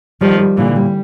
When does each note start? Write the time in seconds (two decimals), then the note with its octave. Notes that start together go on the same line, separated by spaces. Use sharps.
0.21 D#3 F3 G3
0.39 G3
0.57 A#2 D3 E3
0.76 G3